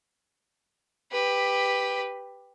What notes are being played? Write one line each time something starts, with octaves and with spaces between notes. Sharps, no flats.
G4 B4